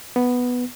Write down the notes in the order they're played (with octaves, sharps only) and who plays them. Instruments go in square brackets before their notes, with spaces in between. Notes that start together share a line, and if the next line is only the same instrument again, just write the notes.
[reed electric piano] B3